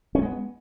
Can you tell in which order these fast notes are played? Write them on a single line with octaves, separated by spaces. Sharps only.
C#4 G3 G#3 B3